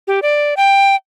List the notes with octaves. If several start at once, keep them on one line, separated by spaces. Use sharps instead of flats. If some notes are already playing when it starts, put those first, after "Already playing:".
G4
D5
G5